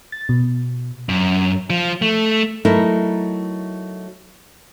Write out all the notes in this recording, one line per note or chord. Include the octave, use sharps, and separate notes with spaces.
A6
B2
F#2
F3
A3
F#3 A3 D#4 E4 A#4